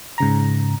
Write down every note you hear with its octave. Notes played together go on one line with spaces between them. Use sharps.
G#2 C#3 A#5